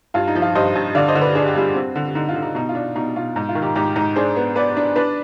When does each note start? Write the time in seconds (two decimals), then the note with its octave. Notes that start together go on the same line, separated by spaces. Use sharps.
0.14 G2 F4
0.28 D#4
0.35 F3
0.42 F4
0.55 G2 C5 D#5
0.75 G2
0.95 D3 D5 F5
1.08 C5 D#5
1.15 D3
1.21 B4 D5
1.35 D4 G#4
1.47 G4
1.56 G3 F4 G#4
1.75 C4
1.95 D3
2.15 D3 D#4
2.29 F4
2.35 D3
2.42 D#4
2.55 B2 D#4
2.69 F4
2.75 D4
2.96 B2 D#4
3.16 B2 F4
3.36 G#2 D#4
3.49 F4
3.55 D#3
3.62 D#4 G4
3.75 G#2 D#4 G4
3.96 G#2 D#4
4.16 D4 G#4 C5
4.36 B3
4.56 B3 B4 D5
4.77 D4
4.96 D4 B4 D5